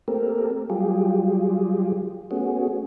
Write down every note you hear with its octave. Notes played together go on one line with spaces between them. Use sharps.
A3 A#3 C4 G4 A4 A#4
F#3 G3 F4 G4 G#4
A3 B3 C#4 F#4 G#4